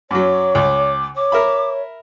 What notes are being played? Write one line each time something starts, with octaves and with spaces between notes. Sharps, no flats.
F#2 F#3 C#5 D6
C#2 D6
C#5 D6
A#4 E5 B5